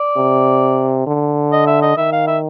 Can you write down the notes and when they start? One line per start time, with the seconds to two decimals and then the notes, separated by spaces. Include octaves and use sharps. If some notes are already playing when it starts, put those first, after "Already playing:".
Already playing: D5
0.17 C3
1.07 D3
1.52 D#5
1.67 E5
1.82 D#5
1.97 D#3 E5
2.13 F5
2.28 E5